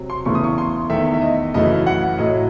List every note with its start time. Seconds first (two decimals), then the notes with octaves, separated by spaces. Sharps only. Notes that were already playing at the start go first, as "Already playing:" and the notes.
Already playing: C3 F#3
0.10 C6
0.25 E2 C#3 E3 A3 C#6
0.35 D#6
0.44 C#6
0.58 C6
0.90 E2 D#3 A3 E5
1.14 E5
1.21 D#5
1.54 F#2 C#3 E3 A3 D#5
1.87 F#5
2.18 A2 F#3 A3 D#5